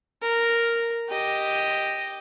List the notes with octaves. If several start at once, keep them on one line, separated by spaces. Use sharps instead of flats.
A#4
G4 D#5